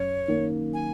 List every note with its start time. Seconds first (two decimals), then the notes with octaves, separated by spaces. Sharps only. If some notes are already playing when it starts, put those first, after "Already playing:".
Already playing: F#2 C#5
0.28 D#3 A#3
0.74 G#5